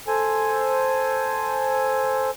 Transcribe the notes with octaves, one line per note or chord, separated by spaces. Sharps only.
A4 C5 G#5